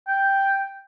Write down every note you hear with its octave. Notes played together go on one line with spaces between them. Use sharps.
G5